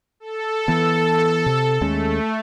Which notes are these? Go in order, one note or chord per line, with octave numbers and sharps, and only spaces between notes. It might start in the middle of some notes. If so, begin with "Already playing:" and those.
A4
E3 B3
C3
D#2 G#3 A3 C#4